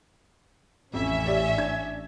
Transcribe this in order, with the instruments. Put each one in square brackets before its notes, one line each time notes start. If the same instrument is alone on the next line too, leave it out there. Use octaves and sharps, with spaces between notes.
[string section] A1 C#4 E5 [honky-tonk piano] F2
[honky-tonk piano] G4 D5
D4 G#6